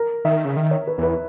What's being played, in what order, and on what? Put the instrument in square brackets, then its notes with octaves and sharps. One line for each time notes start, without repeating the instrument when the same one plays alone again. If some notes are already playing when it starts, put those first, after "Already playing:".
Already playing: [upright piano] A#4
[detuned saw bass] D#3 [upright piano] E5
[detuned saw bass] C#3
D#3
[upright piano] C#5
B4
[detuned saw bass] E2
[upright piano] B4